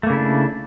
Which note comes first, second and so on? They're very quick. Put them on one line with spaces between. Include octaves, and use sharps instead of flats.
A3 A#3 C#3 E4 D4